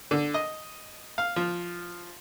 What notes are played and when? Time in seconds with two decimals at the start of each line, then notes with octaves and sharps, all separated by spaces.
0.11 D3
0.34 D#5
1.18 F5
1.36 F3